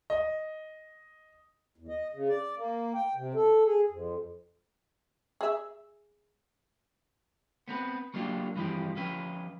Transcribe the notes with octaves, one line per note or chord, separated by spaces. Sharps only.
D#5
E2
D#5
C#3
D5
A#3
G5
C3
A4
G#4
F2
G#4 E5
B3 C4 A#4 B4
F#3 A#3 D4 F4 G4
G2 E3 F3 C4 G4
F3 C#4 B4 G5